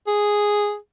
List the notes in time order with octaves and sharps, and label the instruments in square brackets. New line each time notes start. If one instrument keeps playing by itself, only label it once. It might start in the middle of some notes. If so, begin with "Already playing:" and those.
[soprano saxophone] G#4